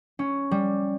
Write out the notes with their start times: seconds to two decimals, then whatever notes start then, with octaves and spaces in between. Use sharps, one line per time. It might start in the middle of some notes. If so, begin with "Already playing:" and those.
0.19 C#4
0.51 G3